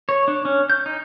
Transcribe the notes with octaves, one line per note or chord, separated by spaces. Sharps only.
C#5
D4
C#4
G6
D#4